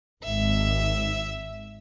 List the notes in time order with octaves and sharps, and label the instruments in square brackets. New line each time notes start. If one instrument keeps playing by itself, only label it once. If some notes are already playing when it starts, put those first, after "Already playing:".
[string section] G#1 [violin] E5